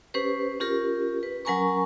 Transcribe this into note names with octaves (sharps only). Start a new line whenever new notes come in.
C#4 G4 B4 C5
C#4 F4 G4 A#4
B4
F#3 C#4 A#4 G#5 A#5 C#6